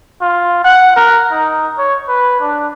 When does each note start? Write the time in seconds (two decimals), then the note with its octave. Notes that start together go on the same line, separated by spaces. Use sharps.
0.21 F4
0.64 F#5
0.96 A#4
1.31 D#4
1.78 C#5
2.08 B4
2.41 D4